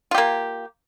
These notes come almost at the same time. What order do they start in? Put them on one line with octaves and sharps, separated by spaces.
F4 G4 A#3